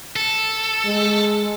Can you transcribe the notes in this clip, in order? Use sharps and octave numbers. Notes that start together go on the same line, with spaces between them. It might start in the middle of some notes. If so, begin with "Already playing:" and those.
A4
G#3